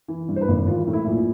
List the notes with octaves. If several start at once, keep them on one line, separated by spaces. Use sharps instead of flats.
E3
G2
C5
B4
G#1
E3 F4
A2
E4
A#1